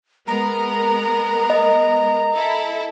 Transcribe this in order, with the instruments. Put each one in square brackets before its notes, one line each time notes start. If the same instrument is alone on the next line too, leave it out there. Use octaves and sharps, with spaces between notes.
[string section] G#3 B3 A#4 [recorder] A#5
[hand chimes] D#5
[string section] E4 A4